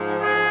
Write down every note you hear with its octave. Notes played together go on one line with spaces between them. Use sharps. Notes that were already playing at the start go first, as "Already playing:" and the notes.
Already playing: G#2 F3
G#4